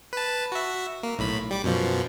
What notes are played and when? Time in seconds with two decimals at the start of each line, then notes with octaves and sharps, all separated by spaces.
0.13 B4 A5
0.52 F#4 E5
1.03 A#3
1.18 B1 A2 B5
1.51 G3 D6
1.64 F#2 B2 F3